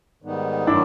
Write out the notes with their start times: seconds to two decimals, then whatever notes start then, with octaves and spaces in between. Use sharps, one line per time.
0.22 G#2 D#3 G3 B3 D#4
0.67 D#3 F#3 A3 D4 E4